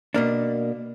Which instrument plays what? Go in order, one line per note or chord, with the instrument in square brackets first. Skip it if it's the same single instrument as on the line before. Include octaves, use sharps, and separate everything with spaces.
[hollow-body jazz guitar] B2 A#3 D4